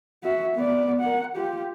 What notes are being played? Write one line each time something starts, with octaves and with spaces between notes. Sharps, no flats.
F#4 E5
B3 D5
A#4 F#5
F4 G4